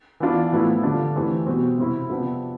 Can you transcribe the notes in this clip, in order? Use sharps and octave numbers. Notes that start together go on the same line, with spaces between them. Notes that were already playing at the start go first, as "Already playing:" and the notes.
E3 B3 D4 F4
A2 F3 B3 E4
D3 G3 D4 F4
E3 A3 C4 G4
B2 G3 C4 G4
C3 G3 C4 E4
C3 F3 B3 D4